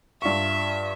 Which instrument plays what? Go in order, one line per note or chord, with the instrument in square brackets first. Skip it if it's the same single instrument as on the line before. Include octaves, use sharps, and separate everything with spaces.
[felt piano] G2 F4 C#6 [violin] E5